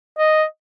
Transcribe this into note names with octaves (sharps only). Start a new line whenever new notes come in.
D#5